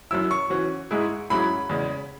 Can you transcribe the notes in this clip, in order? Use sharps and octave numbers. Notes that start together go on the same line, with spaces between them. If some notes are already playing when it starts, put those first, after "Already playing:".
F#2 F#3 E4 E6
C#6
E3 C#4 F#4
G#2 G#3 E4 G#4
G#2 F#3 C#4 E4 G#4 B5
E2 C#3 G#3